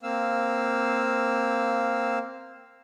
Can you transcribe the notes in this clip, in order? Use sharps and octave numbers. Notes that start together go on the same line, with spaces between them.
A#3 C4 F5 E6